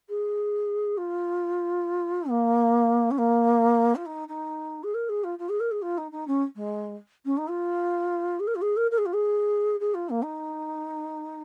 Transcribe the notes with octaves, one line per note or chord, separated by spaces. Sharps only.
G#4
F4
A#3
C#4
A#3
F4
D#4
D#4
G#4
A#4
G#4
F4
F4
G#4
A#4
G#4
F4
D#4
D#4
C#4
G#3
C#4
D#4
F4
G#4
A#4
F4
G#4
A#4
A#4
G#4
F4
G#4
G#4
F4
A#3
D#4